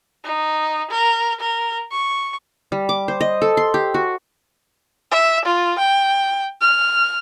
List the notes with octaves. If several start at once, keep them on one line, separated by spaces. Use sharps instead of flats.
D#4
A#4
A#4
C#6
G3
D6
C5
D#5
A4
C6
G4
F#4
E5
F4
G5
F6